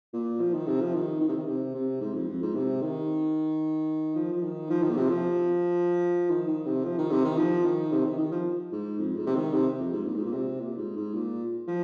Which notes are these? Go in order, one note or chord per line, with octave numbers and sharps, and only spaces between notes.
A#2
F3
D#3
C3
F3
D#3
D#3
C3
D#3
C3
C3
G#2
F2
F2
G#2
C3
D#3
F3
F3
D#3
F3
D#3
A#2
C3
F3
D#3
D#3
C3
F3
D#3
C3
D#3
F3
D#3
C3
D#3
D#3
F3
G#2
F2
G#2
C3
D#3
C3
F2
G#2
A#2
G#2
A#2
C3
A#2
G#2
G#2
A#2
F3